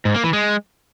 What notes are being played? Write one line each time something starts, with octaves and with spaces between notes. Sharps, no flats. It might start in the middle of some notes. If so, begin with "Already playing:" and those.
G#2
A#3
E3
G#3